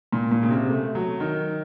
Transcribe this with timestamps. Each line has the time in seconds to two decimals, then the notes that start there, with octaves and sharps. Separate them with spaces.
0.13 A#2
0.31 A#2
0.43 C#3
0.51 C3
0.70 A3
0.95 F#3
1.20 D#3